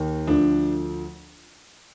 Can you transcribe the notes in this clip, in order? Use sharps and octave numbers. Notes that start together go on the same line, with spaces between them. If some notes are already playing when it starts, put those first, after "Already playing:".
Already playing: D#2 D#3
D2 D3 F3 D4